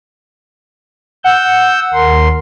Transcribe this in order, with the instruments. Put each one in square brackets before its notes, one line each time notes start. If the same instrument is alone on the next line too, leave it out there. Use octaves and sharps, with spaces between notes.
[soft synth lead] F#5 [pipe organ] E6 G6
[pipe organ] D#2 A#4 C6